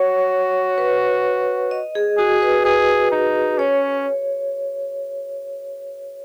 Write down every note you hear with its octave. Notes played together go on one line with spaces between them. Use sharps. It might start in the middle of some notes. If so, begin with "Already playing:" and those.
Already playing: F#4 C#5
B4
D#5
G#4
F#4 G#4
B4
G#4 B4
D#4
C#4 C#5